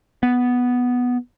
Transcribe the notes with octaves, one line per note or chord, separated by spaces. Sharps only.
B3